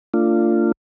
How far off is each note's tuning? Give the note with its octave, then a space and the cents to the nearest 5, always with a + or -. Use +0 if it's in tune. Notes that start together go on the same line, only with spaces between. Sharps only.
A3 +45 D4 +0 F4 -15